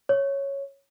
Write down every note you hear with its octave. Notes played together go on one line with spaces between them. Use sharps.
C#5